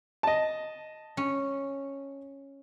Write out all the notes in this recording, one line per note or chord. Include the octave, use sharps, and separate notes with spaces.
D#5 A5
C#4